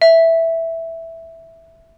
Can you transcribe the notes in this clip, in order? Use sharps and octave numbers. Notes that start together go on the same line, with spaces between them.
E5